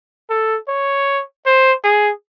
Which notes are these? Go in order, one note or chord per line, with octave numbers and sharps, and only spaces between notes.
A4
C#5
C5
G#4